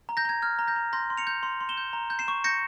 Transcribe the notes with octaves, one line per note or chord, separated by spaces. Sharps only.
A#5
G6 A#6
A#5 G#6
F6 G#6
A#5
G6 A#6
A#5
C6 G6 A#6
C6
C#7 F7
G6
C6
C6
E7 G7
G6
A#5
G6
C7 E7
C#6
G6 A#6 C#7